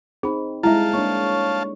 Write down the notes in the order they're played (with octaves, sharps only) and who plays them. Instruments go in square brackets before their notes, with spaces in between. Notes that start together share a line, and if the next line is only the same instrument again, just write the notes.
[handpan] C4 D#4 [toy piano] G#4 B5
[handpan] G3 G#3 G#4 [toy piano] E4 E5 [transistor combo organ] F5 A5
[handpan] A#3 D4 [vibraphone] C#5 C#6